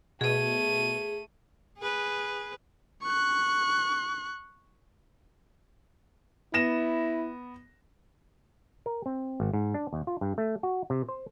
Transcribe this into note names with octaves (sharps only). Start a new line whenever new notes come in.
B2 A3 G#4 D#7
G#4 B4
C#6 F#6
B3 E4 A#6 E7
A#4
C4
G#1
G#2
D4
D#2
F4
G2
A3
F#4
C3
C5